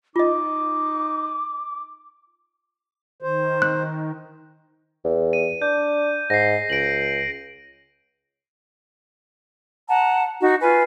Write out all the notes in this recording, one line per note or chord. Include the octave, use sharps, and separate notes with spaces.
D#4 F4 D#5 D6
D#3 C5
F#6
E2
D#7
D4 G6
G#2 A#6 C7
C#2 D7 F#7
F#5 A5 A#5
D#4 F#4
F4 B4 G#5